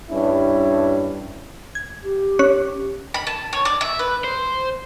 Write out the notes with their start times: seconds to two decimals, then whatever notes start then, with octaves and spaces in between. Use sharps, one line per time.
0.10 G2 C#4 E4
1.75 G#6
2.04 G4
2.39 C#4 C#5 F#6
3.14 B5
3.27 A5
3.53 C#5
3.65 D5
3.81 E5
3.99 B4
4.24 C5